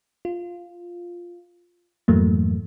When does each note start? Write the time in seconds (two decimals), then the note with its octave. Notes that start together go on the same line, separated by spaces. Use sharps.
0.25 F4
2.08 F2 G#2 E3 F#3 A3 A#3